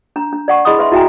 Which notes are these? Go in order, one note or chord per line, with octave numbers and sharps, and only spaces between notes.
D4 A#5
D4
D5 F#5 C#6
E4 G#4 D#5 B5 C6 D#6
B4 E5 C6
E4 F#4 E5 G5 G#5 A#5